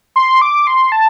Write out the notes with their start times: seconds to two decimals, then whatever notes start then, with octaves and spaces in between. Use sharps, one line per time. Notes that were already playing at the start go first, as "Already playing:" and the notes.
0.16 C6
0.42 D6
0.67 C6
0.92 A5